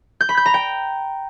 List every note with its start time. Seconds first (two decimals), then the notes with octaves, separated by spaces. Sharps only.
0.21 G6
0.29 B5
0.37 G6
0.46 A#5
0.54 G5